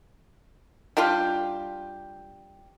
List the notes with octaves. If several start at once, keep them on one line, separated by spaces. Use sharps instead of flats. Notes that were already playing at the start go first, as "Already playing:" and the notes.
G3 D4 F4 G4